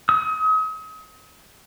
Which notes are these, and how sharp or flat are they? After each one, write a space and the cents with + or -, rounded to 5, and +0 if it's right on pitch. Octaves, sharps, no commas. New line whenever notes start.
D#6 +40